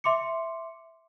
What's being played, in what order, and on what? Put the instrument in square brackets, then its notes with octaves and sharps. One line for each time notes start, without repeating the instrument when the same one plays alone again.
[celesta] E5 C6 D6 C#7